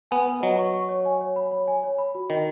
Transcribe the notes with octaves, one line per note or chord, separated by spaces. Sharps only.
B3 G#5
B4
F#3 D#5
C#6
C#6
C#5
G#5
C#5
B5
C#5
G#5
C#5
B5
F#4
D#3 D#5